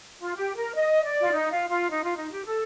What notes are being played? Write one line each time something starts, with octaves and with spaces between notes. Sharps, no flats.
F4
G4
A#4
D#5
D5
F4
D#4
F4
F4
D#4
F4
D#4
G4
A4